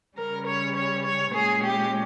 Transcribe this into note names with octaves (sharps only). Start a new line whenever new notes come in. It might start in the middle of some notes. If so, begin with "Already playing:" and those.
C#3 G3 C#4 A#4
C#5
C#5
C#5
A#2 G#3 C#4 G#4
G4